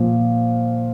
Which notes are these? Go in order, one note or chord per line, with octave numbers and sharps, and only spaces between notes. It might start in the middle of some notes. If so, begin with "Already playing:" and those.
Already playing: A#2 F3